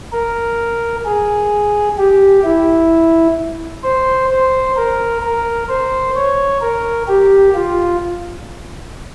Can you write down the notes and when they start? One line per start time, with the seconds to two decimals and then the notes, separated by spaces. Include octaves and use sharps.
0.13 A#4
1.06 G#4
1.98 G4
2.44 E4
3.84 C5
4.30 C5
4.77 A#4
5.22 A#4
5.69 C5
6.16 C#5
6.61 A#4
7.08 G4
7.55 F4